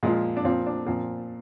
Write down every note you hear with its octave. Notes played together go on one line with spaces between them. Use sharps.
A#2 F3 G#3
D4
A#2 F3 C4
D4
A#2 F3 C4